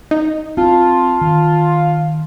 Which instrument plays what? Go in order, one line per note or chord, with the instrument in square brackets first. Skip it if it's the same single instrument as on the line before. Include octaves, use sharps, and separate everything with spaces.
[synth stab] D#4
[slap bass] C4 [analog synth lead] F4 [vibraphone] A5
[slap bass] D#3